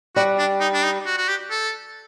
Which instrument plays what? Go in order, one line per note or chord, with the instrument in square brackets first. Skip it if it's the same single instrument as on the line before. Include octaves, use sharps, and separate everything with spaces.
[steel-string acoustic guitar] G3 [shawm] F#4
[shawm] D4
D#4
D4
D#4
F#4
F#4
G4
A4